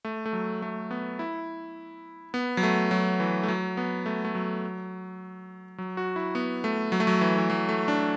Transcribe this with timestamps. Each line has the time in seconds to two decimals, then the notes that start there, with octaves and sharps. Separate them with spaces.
0.05 A3
0.26 A3
0.33 F#3
0.62 A3
0.91 B3
1.19 E4
2.34 B3
2.57 F#3
2.63 A3
2.91 F#3
3.20 E3
3.43 A3
3.48 F#3
3.77 B3
4.06 A3
4.25 A3
4.35 F#3
5.78 F#3
5.97 F#4
6.16 E4
6.35 B3
6.64 A3
6.92 F#3
7.00 A3
7.07 F#3
7.21 E3
7.38 E3
7.50 F#3
7.69 A3
7.88 D4